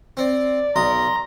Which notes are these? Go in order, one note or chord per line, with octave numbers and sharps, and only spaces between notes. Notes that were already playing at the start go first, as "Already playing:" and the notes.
C4 D5
B1 A#5 C6 D#6